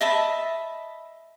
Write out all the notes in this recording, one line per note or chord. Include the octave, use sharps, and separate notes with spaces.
D#5 E5 A5 B5